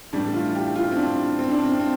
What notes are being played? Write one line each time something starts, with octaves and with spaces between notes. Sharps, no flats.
A2 E3 G3 D4
F4
G4
F4
C4
D4
C4
D4
C4
C4